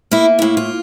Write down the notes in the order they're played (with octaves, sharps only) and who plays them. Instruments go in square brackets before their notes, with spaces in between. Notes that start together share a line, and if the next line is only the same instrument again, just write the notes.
[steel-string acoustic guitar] A#3 E4
A2 E4
F4